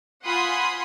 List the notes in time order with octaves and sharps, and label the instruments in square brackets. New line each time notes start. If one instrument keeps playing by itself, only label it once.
[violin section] F4 F#5 G#5 B5 C6 D#6